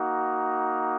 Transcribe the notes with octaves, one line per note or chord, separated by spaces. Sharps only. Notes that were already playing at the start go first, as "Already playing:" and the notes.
Already playing: A#3 D#4 F#4